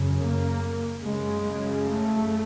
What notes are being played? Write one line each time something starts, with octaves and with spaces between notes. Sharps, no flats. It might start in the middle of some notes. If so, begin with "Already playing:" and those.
Already playing: F#2 C#3
A#3
F#2 C#3 G#3
A3